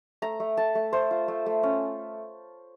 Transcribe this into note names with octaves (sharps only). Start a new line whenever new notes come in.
A3 A#5
A3
A3 A5
A3
A3 C5
F4
A3
A3
C#4